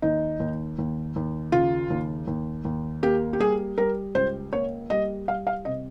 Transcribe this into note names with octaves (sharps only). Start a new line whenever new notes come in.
D#2 D#4
D#2
D#2
D#2
C#3 F4
D#2
D#2
D#2
A#3 G4
G4
G3 G#4
G3 A#4
C#2 C5
A#3 C#5
G3 D#5
G3 F5
F5
C3 D#5